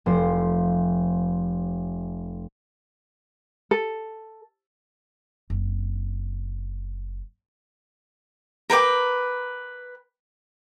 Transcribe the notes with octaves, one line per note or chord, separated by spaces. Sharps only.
F1 C5
A4
F#1 C4
A#4 B4 G5 D6